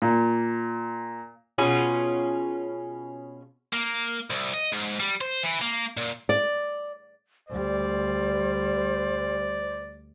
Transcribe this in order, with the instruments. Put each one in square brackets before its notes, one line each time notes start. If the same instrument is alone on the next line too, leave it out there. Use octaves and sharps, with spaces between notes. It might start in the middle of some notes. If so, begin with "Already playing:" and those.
[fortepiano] A#2
[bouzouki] B2 C#4 F4 G#4
[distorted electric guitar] A#3
C2
D#5
G#2
G3
C5
E3
A#3
A#2
[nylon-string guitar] D5
[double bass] D2 G3 [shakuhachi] C5 [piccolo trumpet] D5